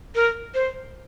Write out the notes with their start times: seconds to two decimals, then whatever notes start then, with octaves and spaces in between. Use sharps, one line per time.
0.15 A#4
0.54 C5